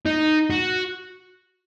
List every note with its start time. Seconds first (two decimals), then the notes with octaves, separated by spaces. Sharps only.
0.06 D#4
0.50 F#4